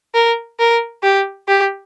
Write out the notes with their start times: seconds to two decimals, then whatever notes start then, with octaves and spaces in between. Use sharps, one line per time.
0.14 A#4
0.59 A#4
1.03 G4
1.48 G4